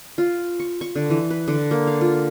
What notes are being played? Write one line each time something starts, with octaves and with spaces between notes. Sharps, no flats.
F4
C#6
C#6
D3
E3
B4
D3
A#3
F5
F4